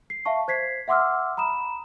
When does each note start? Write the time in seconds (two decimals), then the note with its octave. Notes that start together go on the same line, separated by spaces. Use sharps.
0.10 C7
0.25 E5 F5 A5 C#6
0.48 C5 G#6 B6 C7
0.88 E5 F#5 C6 D6 E6 F6
1.37 A#5 B5 D#6 E7